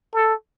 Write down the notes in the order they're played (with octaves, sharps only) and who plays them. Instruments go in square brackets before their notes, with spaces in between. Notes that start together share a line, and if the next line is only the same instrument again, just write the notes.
[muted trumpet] A4